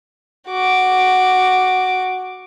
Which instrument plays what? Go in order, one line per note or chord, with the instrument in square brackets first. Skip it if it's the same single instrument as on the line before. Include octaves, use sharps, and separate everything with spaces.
[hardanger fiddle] F#4 D6